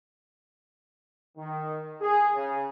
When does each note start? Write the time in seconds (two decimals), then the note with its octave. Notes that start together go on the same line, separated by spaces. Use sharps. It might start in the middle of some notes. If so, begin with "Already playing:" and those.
1.37 D#3
2.00 G#4
2.34 C#3